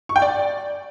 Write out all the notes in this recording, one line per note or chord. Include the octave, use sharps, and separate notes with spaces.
C#6
G5
D5